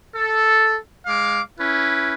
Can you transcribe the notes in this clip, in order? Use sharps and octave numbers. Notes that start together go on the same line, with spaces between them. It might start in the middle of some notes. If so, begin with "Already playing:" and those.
A4
G#3 F5 D6
C#4 E4 B4